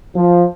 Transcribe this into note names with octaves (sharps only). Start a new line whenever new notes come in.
F3